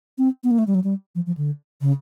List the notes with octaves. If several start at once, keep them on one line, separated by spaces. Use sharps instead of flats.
C4
B3
A#3
A3
G3
F#3
G3
F3
F3
D3
C#3